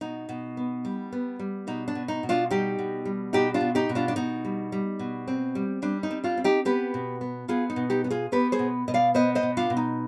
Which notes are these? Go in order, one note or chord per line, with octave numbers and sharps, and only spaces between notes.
B2 D#4
B2
B3
G3
B3
G3
B2 D#4
D4
B2
D#4
B2
D4 F4
G3 D#4 G4
B2
G3
B2 D#4 G4
D4 F4
B2
D#4 G4
B2
D4 F4
D4
B2 D#4
G3
G3
B2
C4
G3
G3 D4
D#4
C4
D4 F4
C4
D#4 G4
B3 G4 B4
B2
B3
B3 F4 G#4
D#4
B2
D#4 G4
B3
F4 G#4
B3 G4 B4
G#4 C5
B2
B2 D#5
D5 F5
B3 C5 D#5
C5 D#5
B2
D4 F4
B2
D#4